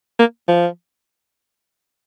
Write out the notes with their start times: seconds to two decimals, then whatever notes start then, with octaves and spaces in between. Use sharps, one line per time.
0.19 A#3
0.48 F3